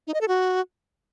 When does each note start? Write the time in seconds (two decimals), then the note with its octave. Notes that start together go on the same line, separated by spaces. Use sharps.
0.07 D#4
0.14 D#5
0.21 A4
0.28 F#4